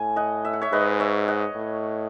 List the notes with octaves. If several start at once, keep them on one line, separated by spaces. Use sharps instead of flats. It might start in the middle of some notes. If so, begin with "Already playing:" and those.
Already playing: A2 G#5
D#5 F#5
E5
F#5
C#5 E5
G#2 B4 D#5
C#5 E5
D#5 F#5
A2